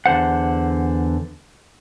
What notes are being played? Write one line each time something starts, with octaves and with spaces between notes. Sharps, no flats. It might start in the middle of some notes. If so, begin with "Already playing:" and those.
E2 D3 C5 F#5